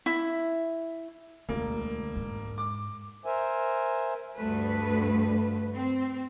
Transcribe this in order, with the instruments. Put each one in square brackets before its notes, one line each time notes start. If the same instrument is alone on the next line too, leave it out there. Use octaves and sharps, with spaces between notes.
[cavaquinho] E4
[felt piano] E1 [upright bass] D2 [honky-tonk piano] A#3
[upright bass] G#2
[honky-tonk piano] D6
[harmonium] A#4 C5 E5 G#5
[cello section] D2 G2 A3 B4
C4